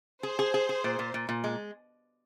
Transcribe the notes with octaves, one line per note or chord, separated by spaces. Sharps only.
G#4 C5
G#4
G#4
G#4
A#2
A#2
A#2
A#2
G#3